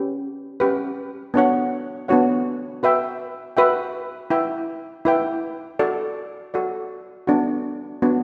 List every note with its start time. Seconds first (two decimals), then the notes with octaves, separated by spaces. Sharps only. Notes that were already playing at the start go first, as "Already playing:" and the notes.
Already playing: C#4 G4 B4
0.60 C#4 G4 B4
1.34 B3 D4 F#4 C#5 F#5
2.08 B3 D4 F#4 C#5 F#5
2.83 F#4 B4 E5 G5
3.57 F#4 B4 E5 G5
4.30 E4 B4 E5 G5
5.05 E4 B4 E5 G5
5.79 F#4 A4 D5
6.54 F#4 A4 D5
7.27 B3 D4 F#4
8.02 B3 D4 F#4